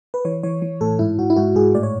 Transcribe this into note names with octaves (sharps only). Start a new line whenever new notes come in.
B4
E3 C#5
E3 C#5
E3
A2 A4
G#2 E4
G#2 F#4
E4
G#2 F#4
G#2 G#4
A2 D5
C#5